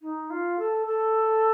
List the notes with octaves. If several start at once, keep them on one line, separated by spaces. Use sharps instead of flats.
D#4
F4
A4
A4